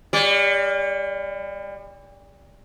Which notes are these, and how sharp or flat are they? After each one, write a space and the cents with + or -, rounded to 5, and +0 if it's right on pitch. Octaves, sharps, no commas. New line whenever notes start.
G3 +40 D5 -30